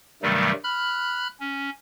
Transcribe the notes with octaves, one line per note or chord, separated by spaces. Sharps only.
G2 C3 D#3 F#3 G3 A3
B5 F6 F#6
C#4